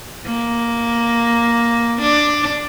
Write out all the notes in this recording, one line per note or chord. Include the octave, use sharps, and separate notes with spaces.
A#3
D4